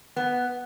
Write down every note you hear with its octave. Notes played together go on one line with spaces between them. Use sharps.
B3